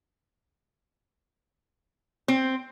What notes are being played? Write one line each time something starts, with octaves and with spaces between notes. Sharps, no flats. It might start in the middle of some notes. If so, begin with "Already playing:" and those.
C4